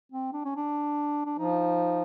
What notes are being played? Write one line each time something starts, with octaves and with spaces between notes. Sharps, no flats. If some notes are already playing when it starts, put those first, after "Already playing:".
C4
D4
C#4
D4
D4
F3 D#4